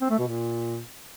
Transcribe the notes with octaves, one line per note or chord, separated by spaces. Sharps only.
C4
A3
B2
A#2